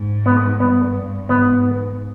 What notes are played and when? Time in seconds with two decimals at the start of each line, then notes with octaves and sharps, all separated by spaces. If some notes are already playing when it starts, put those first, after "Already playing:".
Already playing: G#2
0.26 B3
0.60 G2 B3
1.29 G#2 B3